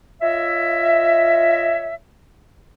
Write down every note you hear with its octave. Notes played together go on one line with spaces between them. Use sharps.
F4 C#5 D#5 E5